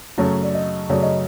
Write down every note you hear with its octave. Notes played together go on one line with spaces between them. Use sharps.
F#2 C#3 F#3 A3 C#4
D5
D#5
F#2 C#3 F#3 A3 C#4 D5
D#5